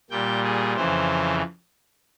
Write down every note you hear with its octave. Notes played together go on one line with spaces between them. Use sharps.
A#2 G3 G5
G#4
F2 C#3 E3 C5